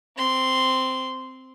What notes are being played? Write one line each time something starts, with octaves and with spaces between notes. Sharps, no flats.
C4 C6